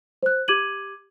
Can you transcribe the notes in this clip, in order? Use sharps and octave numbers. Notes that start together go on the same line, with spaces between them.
C5 F#6
G4 D6 G#6 D#7 F#7